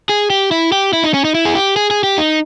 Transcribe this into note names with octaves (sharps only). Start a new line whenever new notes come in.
G#4
G4
E4
G4
E4
D#4
C#4
D#4
E4
G#4
G4
G#4
G#4
G4
D#4